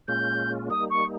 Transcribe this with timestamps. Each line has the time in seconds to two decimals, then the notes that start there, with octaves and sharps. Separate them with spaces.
0.08 A#2 G#3 C#4 F4 G6
0.70 G3 A#3 D#4 D#6
0.90 C#6